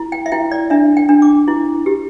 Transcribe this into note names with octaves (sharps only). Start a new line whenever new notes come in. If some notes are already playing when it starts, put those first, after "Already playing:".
Already playing: E4
G5
E5
E4 G5
D5
D4 E5
G5
D4
D6
E4
G4